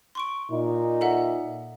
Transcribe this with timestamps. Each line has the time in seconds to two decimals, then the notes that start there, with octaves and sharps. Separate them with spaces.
0.15 C6 C#6 D7
0.51 A#2 D#4
1.01 A4 E5 F#5